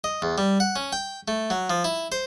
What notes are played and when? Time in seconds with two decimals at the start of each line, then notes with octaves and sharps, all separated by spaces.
0.04 D#5
0.22 E2
0.38 G3
0.60 F#5
0.76 C#4
0.93 G5
1.28 A3
1.50 F#3
1.70 F3
1.84 E4
2.12 C5